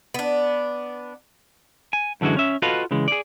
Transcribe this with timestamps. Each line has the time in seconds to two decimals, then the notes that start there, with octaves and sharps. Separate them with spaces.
0.14 B3 D4
1.93 G#5
2.21 F#2 D3 E3 G#3 F#4
2.37 C#4 E5
2.62 F4 F#4 A4 B4 D#5 F5
2.91 C#3 E3 G#3
3.08 G#4 D5